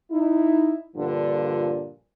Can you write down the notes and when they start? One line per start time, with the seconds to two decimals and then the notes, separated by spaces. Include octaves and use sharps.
0.12 D#4 E4
0.96 G2 A#2 D3 F3